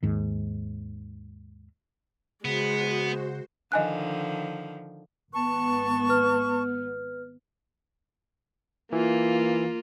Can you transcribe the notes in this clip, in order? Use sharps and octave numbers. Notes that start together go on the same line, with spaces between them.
D#2 G#2 D#3
C#3 G#3 B3 F#4 C5
D3 D#3 F3 D#5 G#5 F#6
G#1 B3 A5 C#6
B4 F6
E3 A#3 F4